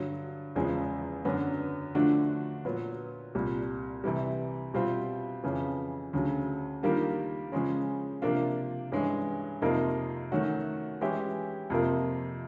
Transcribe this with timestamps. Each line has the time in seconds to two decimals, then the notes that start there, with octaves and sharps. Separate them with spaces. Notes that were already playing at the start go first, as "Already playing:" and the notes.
Already playing: G2 D3 F#3
0.56 E2 C#3 F3 G#3
1.25 F#2 D3 F#3 B3 D4
1.95 D3 F3 A3 D4 F#4
2.65 A#2 F#3 B3
3.35 C2 A#2 G3
4.04 C3 E3 G3
4.74 B2 G3 C4 F4
5.44 F2 C#3 E3
6.13 D2 C#3 F#3
6.83 D#3 G3 A#3 D4 F4
7.52 C#3 F3 G#3 C#4
8.22 C3 F3 A#3 D4 F4
8.92 G2 E3 G#3 C#4
9.62 F2 C3 F3 A#3 D#4
10.32 D#3 F#3 A3 C#4 F#4
11.01 E3 G#3 C#4 E4 G4
11.70 F2 C3 F3 A#3